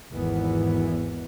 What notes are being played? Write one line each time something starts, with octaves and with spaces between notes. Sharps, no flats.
G#1 E2 E3 B3